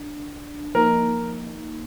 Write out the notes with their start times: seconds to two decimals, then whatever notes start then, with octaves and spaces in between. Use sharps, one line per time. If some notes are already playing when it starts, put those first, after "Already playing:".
Already playing: D4
0.75 F3 A#3 D#4 A#4